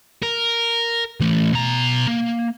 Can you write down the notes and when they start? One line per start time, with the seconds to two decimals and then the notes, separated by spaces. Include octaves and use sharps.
0.22 A#4
1.20 E3 A3
1.53 B2 A#5
2.08 A#3